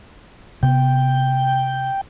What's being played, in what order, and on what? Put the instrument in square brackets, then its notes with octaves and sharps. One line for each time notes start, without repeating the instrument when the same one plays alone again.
[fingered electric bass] C3 B3 [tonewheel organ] G5